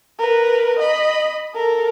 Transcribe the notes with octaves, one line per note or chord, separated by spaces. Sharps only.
A#4 B4
D#5 B5
A4 A#4